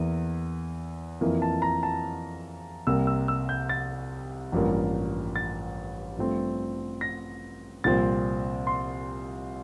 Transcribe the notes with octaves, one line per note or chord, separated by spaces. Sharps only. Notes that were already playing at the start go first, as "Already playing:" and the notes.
Already playing: E2 E3 A#3
F2 E3 A#3
A5
A#5
A5
C2 C3 G3 A#3 E6
E6
E6
G6
A6
A1 G2 F3 A#3
A6
G2 F3 A3 C4
A#6
C2 A#2 F3 C4 A6
C6